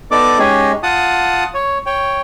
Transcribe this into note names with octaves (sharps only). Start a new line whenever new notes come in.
B3 D#4 A4 D5 D6
G#3 C#4 D#4 G4 G#4
F4 F#5 A5 D#6
C#5
C#5 G5